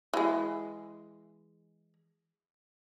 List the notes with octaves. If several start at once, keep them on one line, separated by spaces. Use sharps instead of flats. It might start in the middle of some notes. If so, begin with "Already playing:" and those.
E3 G#3